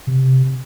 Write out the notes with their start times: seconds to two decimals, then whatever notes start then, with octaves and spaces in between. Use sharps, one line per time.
0.07 C3